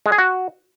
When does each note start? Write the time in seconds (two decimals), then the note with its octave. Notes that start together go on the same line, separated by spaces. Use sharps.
0.06 G#3
0.12 G#4
0.18 F#4